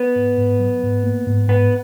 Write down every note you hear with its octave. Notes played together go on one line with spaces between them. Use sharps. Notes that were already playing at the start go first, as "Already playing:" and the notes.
Already playing: B3
G#2
G#2
F#3
G#2
A#3
G#2
G#2 B3